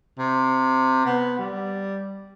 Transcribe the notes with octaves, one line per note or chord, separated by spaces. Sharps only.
C3
B3
G3